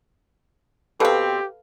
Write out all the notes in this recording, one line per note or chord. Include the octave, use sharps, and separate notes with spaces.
B2 C4 G4 A4 B4 F5